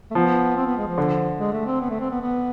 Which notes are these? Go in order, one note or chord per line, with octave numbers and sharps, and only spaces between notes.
A3
F3 B3
C4
B3
G#3
F3
D3
G#3
A3
C4
B3
A3
C4
B3
B3